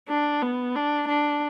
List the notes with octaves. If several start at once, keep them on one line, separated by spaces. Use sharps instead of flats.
D4
B3
D4
D4